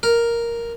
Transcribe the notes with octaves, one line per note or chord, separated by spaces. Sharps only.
A#4